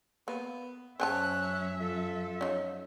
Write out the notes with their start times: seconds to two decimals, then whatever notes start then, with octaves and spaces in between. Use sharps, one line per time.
0.28 A#3 B3
1.00 F#2 C#4 C5 E5 G#5 A5 F#6
1.80 F3 A4
2.41 C#4 D#4